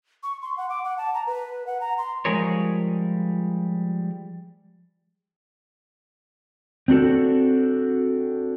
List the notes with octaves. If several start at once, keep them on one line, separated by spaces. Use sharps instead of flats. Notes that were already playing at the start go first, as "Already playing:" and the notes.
C#6
C6
F#5
D6
F#5
A5
A#5
B4
F#5
A#5
C6
F3 G3 G#3 G#4 A#4 C#5
C4 D4 F#4 A4